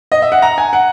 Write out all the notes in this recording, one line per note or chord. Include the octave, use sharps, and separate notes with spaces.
D#5
E5
F#5
A#5
G#5
F#5